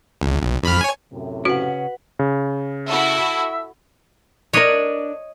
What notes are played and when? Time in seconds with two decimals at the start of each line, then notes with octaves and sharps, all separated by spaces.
0.21 C#2
0.41 B1
0.63 F2 B5 F6
0.81 C#5 G#5
1.12 F#2 A2 C3
1.45 C#3 C#4 F#4 B4 F#5
2.19 C#3
2.88 E4 F#4 A4 E5
4.53 D4 A#4 C#5 D#5